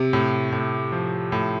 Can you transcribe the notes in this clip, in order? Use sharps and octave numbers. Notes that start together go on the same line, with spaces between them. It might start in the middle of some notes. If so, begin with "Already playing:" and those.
Already playing: C3
A2
A2
F3
A2